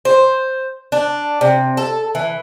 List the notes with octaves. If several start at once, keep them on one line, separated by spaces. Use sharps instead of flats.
C5
D4
C3
A4
E3